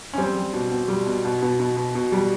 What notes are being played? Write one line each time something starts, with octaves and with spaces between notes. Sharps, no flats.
C#4
G3 C4
G3
B2
B2
G3
B2
B2
B2
B2
B2
B2
G3